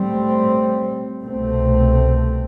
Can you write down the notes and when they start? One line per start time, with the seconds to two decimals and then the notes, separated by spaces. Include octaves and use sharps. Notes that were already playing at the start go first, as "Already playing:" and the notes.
Already playing: A2 G3 C4
1.24 C2 B2 A3 C4